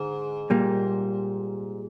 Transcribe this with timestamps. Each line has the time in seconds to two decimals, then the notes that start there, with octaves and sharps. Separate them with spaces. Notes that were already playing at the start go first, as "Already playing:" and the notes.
Already playing: G#2 D3
0.50 A#2 G3 A#3